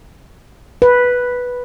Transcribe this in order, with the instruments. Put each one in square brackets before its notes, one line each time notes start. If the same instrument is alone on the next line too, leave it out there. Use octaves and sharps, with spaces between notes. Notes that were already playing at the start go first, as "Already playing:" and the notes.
[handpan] B4